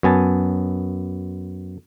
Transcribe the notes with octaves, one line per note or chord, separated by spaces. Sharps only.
F#2 B3 G#5 A5